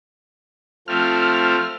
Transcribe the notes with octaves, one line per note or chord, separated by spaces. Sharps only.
F3 A3 C4 F6